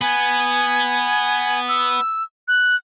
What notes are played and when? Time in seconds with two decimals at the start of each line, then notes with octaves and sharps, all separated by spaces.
0.01 B3 G#5
1.68 E6
2.48 F#6